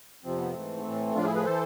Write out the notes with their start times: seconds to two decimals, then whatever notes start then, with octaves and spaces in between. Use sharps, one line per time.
0.24 F2 C3 F3 C4
0.38 B3
0.52 G#2 E3 A3 C4
0.84 A2 E3
1.15 A2 F3 D4 F4
1.24 E4 G#4
1.35 G#4 B4
1.44 E3 A4 C5